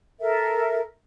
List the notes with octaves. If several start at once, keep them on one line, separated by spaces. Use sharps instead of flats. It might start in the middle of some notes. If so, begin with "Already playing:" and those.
A4 A#4 E5